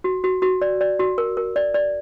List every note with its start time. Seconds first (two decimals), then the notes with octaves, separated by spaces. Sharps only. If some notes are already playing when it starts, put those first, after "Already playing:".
0.04 F#4
0.24 F#4
0.42 F#4
0.62 D5
0.81 D5
0.99 F#4
1.18 A#4
1.37 A#4
1.56 D5
1.74 D5